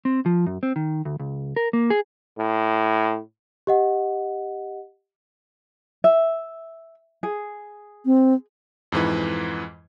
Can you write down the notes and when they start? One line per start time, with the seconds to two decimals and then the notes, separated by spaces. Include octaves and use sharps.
0.05 C4
0.26 F3
0.47 F#2
0.63 C4
0.76 D#3
1.05 D2
1.20 C#2
1.56 A#4
1.73 A#3
1.90 G#4
2.38 A2
3.67 G4 D#5 F#5
6.04 E5
7.23 G#4
8.06 C4
8.92 F2 G#2 E3 B4